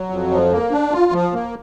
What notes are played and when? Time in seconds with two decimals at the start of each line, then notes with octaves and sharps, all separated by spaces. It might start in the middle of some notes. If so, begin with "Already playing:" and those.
Already playing: F#3
0.10 F2
0.31 F3
0.51 A#3
0.71 D4
0.92 F4
1.12 F3
1.33 A#3